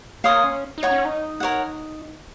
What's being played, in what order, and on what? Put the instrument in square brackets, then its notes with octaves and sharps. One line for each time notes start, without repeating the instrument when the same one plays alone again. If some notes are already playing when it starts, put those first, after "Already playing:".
[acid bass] A#3 [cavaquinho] C#5 F5 C6 D#6
[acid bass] C#4
D#4
[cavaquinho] C#5 F#5 C#6
[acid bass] C#4
D#4
[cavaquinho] A#4 C#5 F#5